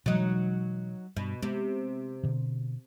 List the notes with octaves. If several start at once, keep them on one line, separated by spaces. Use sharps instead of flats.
B2 E3 F#3 G#3 D#4
G2 B2
C3 G#3 B3
B2 D3